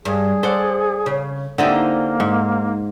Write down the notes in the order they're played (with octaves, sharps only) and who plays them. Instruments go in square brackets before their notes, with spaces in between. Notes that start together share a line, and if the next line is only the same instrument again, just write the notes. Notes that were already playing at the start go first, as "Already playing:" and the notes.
[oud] G2 [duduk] G#4
[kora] A4 D5 F#5 [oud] C5
[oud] C#3
[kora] D3 G4 [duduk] A#3 [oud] C4 D#4 E4
[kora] G#2